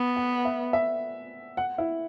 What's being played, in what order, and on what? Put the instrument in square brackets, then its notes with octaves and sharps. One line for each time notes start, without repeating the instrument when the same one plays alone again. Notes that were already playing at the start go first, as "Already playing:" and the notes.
Already playing: [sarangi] B3
[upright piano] F#5
E5
E5
F#5
E4